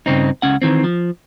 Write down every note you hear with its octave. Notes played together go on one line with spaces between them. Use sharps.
G2 C#3 C4 D#4
C#2 C#4 F#5
D#3 E3 C4
F3